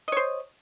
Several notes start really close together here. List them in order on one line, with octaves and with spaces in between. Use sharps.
D#5 C#5 C5